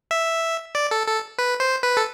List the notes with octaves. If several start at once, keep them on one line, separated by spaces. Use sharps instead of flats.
E5
D5
A4
A4
B4
C5
B4
A4